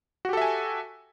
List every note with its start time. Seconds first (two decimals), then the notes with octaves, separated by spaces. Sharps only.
0.25 F#4
0.29 G4
0.33 A4
0.37 E5
0.42 G#5